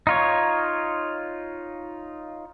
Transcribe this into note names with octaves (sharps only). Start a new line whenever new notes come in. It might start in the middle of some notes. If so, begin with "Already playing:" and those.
D#4 F4 C#5